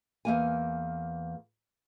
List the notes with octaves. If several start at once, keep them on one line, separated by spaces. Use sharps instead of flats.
E2 A#3 G#5